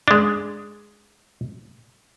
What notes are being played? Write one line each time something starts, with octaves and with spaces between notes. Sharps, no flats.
G#3 D4